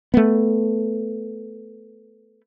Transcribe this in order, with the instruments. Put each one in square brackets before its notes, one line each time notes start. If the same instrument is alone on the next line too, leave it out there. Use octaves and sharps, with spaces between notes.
[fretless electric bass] A3 B3